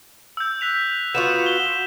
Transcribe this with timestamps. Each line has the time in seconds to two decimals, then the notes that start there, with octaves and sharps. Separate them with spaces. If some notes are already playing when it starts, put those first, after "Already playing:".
0.37 E6 G6
0.61 F#6 B6 F7
1.15 B3 F4 F#4 E7
1.46 G7